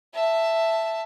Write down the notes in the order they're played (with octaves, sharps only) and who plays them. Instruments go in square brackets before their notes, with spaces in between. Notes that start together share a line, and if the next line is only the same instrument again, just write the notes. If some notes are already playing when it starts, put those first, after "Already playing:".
[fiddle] E5 A5